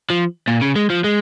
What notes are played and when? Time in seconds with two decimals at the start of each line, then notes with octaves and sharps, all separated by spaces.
0.10 F3
0.48 A#2
0.61 C#3
0.76 G#3
0.90 F3
1.04 G#3